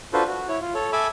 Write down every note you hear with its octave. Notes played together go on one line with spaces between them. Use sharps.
D4 F4 F#4 A4 B4 C5
F#4
E4 C#5
F4
A4 C#5
A4 E5 G#5 B5 D6 E6